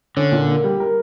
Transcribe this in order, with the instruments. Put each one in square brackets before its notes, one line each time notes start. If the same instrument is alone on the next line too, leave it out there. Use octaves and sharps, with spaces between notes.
[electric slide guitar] D3 [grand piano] C#4
[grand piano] A#2
A#3
G3
A#4